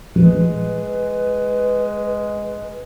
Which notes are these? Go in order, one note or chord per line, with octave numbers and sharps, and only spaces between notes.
A#1 G#3 B4